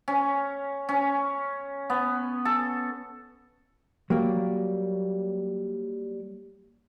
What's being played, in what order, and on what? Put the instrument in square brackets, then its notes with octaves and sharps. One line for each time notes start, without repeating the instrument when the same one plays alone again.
[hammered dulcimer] C#4
C#4
B3
A4
[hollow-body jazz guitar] F#3 G3 A#3